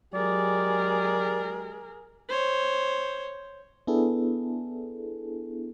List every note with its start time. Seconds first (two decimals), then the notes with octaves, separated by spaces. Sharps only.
0.14 F#3 G#3 G4 G#4 A#4 D5
2.29 C5 C#5
3.87 B3 D4 E4 G#4 A4